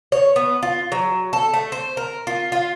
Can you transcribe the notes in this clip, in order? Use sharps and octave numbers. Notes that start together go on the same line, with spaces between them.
C#5
B3
F4
F#3
A4
A3
C5
A#4
F4
F4